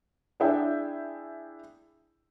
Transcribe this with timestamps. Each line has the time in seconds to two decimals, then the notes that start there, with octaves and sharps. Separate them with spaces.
0.40 D4 E4 G#4 E5 G5